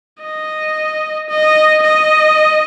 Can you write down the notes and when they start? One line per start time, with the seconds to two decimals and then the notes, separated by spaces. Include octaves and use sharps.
0.22 D#5
1.29 D#5
1.83 D#5